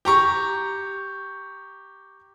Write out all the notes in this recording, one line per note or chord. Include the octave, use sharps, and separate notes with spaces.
G4 A#5 C#6